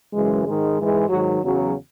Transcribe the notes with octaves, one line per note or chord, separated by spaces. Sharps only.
F#2 C#3 E3 G#3
G#2 D#3 G#3
G#2 E3 G#3
G#2 D#3 F#3 F#4
E2 C#3 F#3